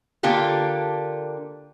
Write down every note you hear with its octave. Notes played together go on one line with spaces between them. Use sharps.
D3 A#3 D4 F4 G4 A4